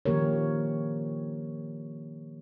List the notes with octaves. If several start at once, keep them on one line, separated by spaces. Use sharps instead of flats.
D#3 F3 A#3 G4 A#4 C#5